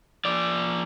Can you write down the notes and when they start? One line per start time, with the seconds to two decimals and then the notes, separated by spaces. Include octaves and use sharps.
0.25 F3 D5